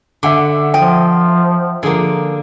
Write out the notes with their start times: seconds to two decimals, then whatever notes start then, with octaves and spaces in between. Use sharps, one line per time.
0.23 D3 E5 F#5 D6
0.74 F3 D#5 G5
1.83 D3 F3 A#3 G#4 A#4